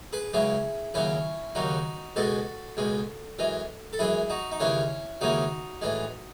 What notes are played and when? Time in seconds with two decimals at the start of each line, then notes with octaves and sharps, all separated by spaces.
0.13 G#4 B4
0.33 C#2 C#3 F#3 E4 G#4
0.94 D#2 C#3 F#3 C#4 E4
1.55 D#2 C#3 F#3 D#4 F#4
2.16 C#2 B2 G#3 F#4 A4
2.77 C#2 B2 G#3
3.39 F#2 E3 G#3
3.93 A4
3.99 F#2 E3 G#3 E4 G#4
4.30 D#4 F#4
4.52 D#4
4.60 D#2 C#3 E3 G#3 C#4 E4
5.21 D#2 C#3 E3 G#3 D#4 F#4
5.82 A2 E3 G#3